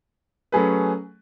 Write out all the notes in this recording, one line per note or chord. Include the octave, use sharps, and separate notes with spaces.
F#3 A3 C#4 G#4 B4